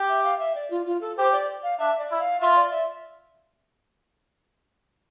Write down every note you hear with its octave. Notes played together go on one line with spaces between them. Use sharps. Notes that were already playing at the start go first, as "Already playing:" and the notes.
Already playing: G4
E5
F5
E5
D5
F4
F4
A4
G4 C5
D5
F5
D4 E5
D5
E4
F5
F4 E5
D5
E5